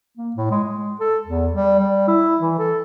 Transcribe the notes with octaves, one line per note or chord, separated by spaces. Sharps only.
A#3
A2
G#3
G#3
A4
E2
G3
G3
E4
E3
A4